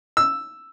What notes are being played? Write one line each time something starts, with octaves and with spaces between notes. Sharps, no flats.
E6